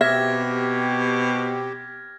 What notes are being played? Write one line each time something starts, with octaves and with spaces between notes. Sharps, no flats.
B2 C4 G4 E5 F6 G#6 A#6